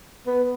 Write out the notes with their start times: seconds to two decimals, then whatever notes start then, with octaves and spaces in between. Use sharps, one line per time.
0.27 B3